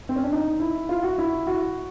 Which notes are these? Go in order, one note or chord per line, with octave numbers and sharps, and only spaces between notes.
C4
C#4
D4
D#4
E4
F4
F#4
E4
F#4